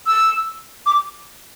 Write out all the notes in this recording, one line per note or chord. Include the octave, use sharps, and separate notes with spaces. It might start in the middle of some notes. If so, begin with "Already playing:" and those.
E6
D6